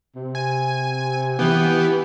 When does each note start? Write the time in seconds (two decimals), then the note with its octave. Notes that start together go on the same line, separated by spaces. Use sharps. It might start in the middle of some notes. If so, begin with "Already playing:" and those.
0.16 C3
0.35 G#5
1.39 E3 B3 G4